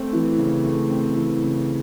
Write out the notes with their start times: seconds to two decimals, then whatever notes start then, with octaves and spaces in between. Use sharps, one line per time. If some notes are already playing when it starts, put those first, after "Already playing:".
Already playing: A3 C4
0.13 E3
0.38 C#3
0.64 A3
0.90 C4
1.15 E3
1.42 C#3